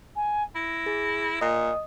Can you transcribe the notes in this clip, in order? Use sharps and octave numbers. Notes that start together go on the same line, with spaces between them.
G#5
E4 A#6
G#4
A#2 D#5 D#6